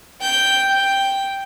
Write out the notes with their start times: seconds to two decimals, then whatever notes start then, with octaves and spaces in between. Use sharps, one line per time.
0.22 G5 G6
0.73 G5